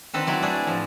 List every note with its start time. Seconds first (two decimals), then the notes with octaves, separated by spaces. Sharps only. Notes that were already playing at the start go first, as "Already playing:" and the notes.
0.14 D3 D#3 C4 A4 B4
0.27 F#3 E4 D5
0.42 A3 D4 G#4
0.67 A2 F3